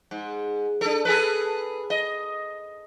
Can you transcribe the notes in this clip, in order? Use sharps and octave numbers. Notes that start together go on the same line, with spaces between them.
G#2
D4 A4
G#4 A4 B4
D#5